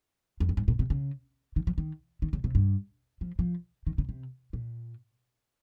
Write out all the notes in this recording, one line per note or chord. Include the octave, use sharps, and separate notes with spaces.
F2
G2
G#2
A#2
C3
C#3
D#3
F3
D#3
D#3
C#3
C3
G2
F3
F3
D#3
C#3
C3
A#2